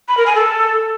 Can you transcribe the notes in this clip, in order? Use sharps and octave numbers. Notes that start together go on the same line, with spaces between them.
B5
A#4
G#5
A4